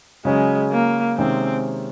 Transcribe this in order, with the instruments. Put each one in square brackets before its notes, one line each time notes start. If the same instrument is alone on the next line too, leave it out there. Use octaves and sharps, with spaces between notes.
[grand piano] C#3 F#3 C#4 [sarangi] G#3
[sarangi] A#3
[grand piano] C3 D#3 G#3 C#4 [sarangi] C4